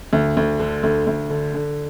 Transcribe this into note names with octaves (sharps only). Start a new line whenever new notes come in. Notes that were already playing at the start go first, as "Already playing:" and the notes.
D2
D2
D3
D2
D2
D3
D3